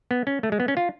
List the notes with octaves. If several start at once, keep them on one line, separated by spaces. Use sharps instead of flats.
B3
C#4
A3
G#3
B3
C#4
F4